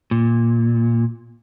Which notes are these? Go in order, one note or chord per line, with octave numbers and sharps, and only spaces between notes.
A#2